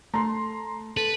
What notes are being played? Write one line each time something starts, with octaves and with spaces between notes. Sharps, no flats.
A3 A#5 C6
A4 B4